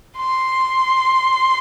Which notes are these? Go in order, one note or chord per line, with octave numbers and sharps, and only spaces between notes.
C6